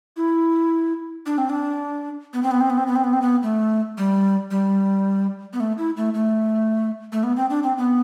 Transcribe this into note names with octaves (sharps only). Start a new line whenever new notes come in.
E4
D4
C4
D4
B3
C4
B3
C4
B3
C4
B3
C4
B3
C4
B3
A3
G3
G3
B3
A3
E4
A3
A3
A3
B3
C4
D4
C4
B3